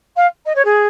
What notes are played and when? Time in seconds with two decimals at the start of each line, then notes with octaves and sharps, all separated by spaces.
0.16 F5
0.45 D#5
0.55 C#5
0.65 G#4